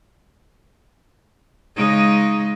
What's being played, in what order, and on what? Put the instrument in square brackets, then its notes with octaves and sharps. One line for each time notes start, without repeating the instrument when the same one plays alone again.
[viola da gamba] C#3 G#3 D#4